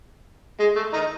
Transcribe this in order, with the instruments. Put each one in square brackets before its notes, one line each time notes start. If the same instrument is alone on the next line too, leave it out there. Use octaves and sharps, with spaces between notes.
[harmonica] G#3
A3
D#3 D#4